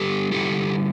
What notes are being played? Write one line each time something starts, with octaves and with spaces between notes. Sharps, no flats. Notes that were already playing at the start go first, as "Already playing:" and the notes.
Already playing: D3 G3 B3 G4 A4
D3 G3 B3 E4 G4 A4